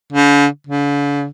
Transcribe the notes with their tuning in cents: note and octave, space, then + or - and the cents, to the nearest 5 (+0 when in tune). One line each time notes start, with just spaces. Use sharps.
D3 -45
D3 -45